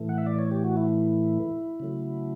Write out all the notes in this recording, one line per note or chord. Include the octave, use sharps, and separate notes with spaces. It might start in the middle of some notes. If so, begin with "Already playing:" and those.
Already playing: A2 E3 A3
F#5
E5
D5
C#5
G4
F#4
E4
C#3 F#3 A3